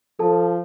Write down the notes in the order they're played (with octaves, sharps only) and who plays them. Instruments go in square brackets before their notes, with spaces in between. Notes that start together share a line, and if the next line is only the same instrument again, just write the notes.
[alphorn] F3 [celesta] A4 A5